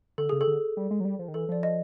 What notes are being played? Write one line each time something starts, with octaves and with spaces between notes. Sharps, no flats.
D3 A4
C#3 G#4
A4
D3
G3
G#3
F#3
G3
F3
D#3
E3 A4
F3 D5
D#5